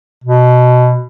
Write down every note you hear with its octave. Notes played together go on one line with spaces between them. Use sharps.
B2